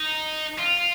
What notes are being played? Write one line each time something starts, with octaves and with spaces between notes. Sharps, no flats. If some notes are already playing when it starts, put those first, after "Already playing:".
Already playing: D#4
F4